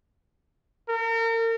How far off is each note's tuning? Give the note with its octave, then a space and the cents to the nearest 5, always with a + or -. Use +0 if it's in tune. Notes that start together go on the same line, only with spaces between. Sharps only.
A#4 -40